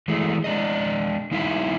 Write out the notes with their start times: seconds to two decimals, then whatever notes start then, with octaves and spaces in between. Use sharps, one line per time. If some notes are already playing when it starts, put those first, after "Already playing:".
0.08 E3 G#3 A3
0.44 G#3 D4 D#5
1.31 G3 D#4 E4 F5